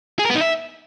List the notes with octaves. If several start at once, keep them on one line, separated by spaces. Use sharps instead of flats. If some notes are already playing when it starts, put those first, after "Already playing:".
G#4
A#4
B3
D#4
E5